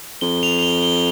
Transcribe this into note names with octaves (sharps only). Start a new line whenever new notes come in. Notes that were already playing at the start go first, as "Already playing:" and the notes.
F2 G7
F7
F7
G7
G7